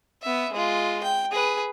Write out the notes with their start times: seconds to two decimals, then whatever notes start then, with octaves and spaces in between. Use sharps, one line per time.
0.23 B3 E5
0.53 G#3 F4
1.03 G5
1.31 G#4 B4